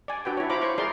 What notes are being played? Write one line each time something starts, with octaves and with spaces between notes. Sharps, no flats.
D5 G#5
D4 F#4 B4 G5
E4 C#5
F4 C5 A#5 B5 D6
C5 C#6
E4 G#4 A#4 D5 C6